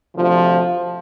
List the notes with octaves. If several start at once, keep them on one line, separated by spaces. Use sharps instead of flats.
D2 C3 F3